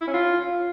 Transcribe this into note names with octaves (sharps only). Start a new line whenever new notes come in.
E4
C#4
F4